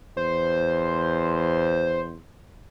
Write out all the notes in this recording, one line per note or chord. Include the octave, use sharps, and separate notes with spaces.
E2 C5